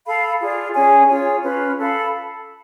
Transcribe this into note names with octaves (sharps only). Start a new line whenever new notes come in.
A4 F5 B5
F4 G#4 D5
C#4 G#4 C#5 G#5
F4 G#4 C#5
C#4 F4 B4
A4 F5 B5